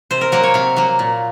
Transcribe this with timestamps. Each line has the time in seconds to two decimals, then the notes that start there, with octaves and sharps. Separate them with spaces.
0.11 C3 C5
0.21 A#4
0.32 F#3 A#3 A#4
0.43 C#5
0.54 C3 F5
0.76 F#3 A#3
0.99 A#2